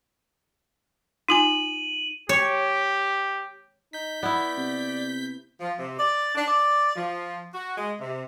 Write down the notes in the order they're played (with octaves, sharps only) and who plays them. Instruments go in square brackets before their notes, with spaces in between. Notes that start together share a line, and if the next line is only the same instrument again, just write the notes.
[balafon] D#4 F4 G#5 [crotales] D#7 F#7
[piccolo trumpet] G4 [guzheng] C#5
[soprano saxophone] D#4 [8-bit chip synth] G6 B6
[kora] B3 E4 [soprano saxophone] D5
[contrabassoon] C3
[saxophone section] F3
C3
D5
D4
D5
F3
F#4
G#3
C3